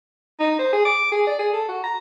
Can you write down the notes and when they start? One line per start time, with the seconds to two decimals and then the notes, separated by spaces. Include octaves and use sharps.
0.40 D#4
0.59 C5
0.72 G#4
0.85 D6
1.12 G#4
1.27 D5
1.39 G#4
1.53 A4
1.68 F#4
1.83 A#5